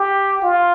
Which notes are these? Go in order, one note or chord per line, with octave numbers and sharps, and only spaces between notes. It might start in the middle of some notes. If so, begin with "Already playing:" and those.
Already playing: G4
F4